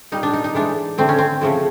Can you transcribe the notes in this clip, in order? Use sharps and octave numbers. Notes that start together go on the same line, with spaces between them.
A#2 G3 D#4
D4
D#4
D#4
A2 E3 G#3 D4
D3 F#3 A3 C4
C#4
C4
C#3 F3 A3